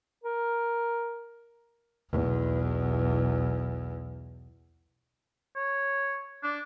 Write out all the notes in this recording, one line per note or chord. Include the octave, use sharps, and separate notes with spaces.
A#4
B1 E2
C#5
D4